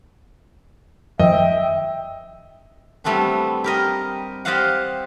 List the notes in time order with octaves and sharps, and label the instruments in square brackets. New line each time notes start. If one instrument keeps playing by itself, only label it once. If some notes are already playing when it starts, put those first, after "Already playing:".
[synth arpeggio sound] F#2 D#3 F3 [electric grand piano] D#5 [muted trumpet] E5 [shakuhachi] G5
[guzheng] G3 A3 B3 C4 D4
G4 A#4 D#5
G4 C5 D5 D#5 F5 F#5